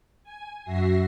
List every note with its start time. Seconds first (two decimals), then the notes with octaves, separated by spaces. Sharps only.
0.23 G#5
0.64 F#2 F#4 E5 A#6 C7